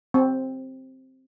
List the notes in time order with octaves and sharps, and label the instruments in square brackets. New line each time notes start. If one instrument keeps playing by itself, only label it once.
[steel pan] C4